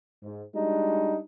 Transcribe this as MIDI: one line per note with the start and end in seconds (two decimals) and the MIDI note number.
0.23 0.43 44
0.55 1.18 55
0.55 1.18 56
0.55 1.18 62
0.55 1.18 63
0.55 1.18 66